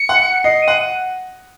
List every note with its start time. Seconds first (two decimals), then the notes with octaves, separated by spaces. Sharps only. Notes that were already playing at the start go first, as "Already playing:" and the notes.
Already playing: C#7
0.09 F#5
0.44 D#5 C7
0.62 D#7
0.68 F#5